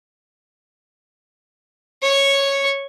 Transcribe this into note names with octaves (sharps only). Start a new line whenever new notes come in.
C#5 C#6